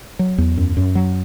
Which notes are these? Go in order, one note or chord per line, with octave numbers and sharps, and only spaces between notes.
F#3
E2
F#2
F#2
F#3